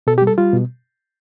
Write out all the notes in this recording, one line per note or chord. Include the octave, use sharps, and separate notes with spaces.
B2 A4
G4
G3
A4
G3 F4
B2